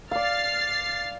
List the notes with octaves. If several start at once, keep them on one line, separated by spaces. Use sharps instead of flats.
D5 F5 F6 A6 C7